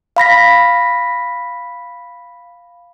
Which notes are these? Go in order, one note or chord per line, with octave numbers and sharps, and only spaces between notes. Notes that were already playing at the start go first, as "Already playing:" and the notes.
F5 B5 A#6 B6